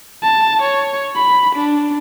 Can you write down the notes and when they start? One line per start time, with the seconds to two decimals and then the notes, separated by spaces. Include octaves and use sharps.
0.23 A5
0.62 C#5
1.15 B5
1.55 D4